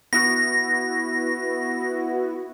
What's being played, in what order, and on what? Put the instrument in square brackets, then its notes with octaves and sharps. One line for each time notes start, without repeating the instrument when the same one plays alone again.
[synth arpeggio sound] B3 E4 F#4 [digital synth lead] A#6